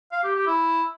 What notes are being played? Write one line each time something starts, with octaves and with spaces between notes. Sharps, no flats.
F5
G4
G4
E4